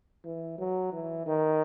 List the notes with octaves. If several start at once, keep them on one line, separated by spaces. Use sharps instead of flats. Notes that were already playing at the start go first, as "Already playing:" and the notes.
E3
F#3
E3
D#3